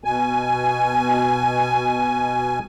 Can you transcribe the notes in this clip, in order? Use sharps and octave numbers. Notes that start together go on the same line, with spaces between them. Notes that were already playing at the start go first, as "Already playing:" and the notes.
B2 G#5